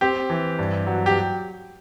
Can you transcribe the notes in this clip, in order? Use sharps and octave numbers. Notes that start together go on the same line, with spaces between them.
C4 G4
E3
G2
F#3
G4